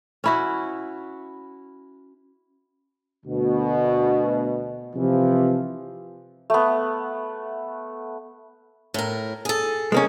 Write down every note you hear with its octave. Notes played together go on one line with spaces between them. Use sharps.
C#4 E4 F#4
D2 B2
C3 E3 F3
A3 B3
A2 A#4
G#4 A4
G#3 A#3 C#4